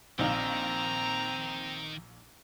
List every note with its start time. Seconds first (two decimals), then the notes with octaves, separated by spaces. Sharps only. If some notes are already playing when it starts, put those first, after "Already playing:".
0.19 A#1 D#3 C4 D#4 F5 A#5